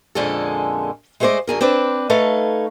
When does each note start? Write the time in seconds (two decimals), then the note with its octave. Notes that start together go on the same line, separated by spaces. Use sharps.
0.15 F2 A#2 D3 G#3 C#4 A4
1.20 G#3 A3 G#4 C5 D5 D#5
1.47 F#2 D3 G#4 A#4
1.61 C4 D4 B4 D5
2.10 A3 D#4 A4 B4 C#5 F5